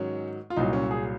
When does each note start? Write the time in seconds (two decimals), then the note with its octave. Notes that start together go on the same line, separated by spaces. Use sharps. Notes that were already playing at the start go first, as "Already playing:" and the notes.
Already playing: G#2 D#3 F#3 C#4
0.50 F4
0.56 C2 A#2 F#3 D#4
0.73 C#4
0.91 G#4